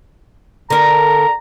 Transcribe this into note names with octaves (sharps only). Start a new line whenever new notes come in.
D3 A#4 A#5